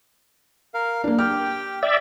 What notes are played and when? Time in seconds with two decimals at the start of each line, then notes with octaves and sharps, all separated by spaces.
0.74 A#4 F5
1.04 A#3 D4
1.18 G4 G5 F6
1.83 D5 E5